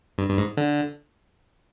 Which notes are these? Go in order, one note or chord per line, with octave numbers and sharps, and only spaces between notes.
G2
G2
G#2
D3